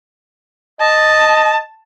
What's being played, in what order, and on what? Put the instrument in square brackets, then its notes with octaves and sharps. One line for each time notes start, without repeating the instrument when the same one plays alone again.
[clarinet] D#5 [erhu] A5